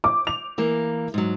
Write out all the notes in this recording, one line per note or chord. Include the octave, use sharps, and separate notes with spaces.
D6
F7
E3 A#3
G#2 F#3